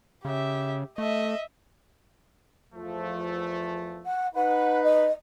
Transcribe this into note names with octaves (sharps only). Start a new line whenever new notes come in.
C#3 G4 E5
A3 D#5 E5
E2 F3 A3
F#5
D#4 B4 F#5
D#5